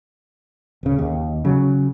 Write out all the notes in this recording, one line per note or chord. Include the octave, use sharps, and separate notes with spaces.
D1 C#3
D#2
C#3 F#3